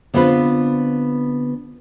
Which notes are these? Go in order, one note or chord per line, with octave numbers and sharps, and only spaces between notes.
D3 B3 C4 F4 B4